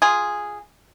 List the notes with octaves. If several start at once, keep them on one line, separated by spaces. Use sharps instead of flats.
F4 G#4